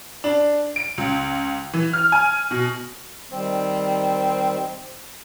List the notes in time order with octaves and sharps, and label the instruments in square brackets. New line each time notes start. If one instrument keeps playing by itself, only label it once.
[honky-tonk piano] D4
D7
C#2
E3
F6
G#5
B2
[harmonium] D#3 G3 [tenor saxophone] C4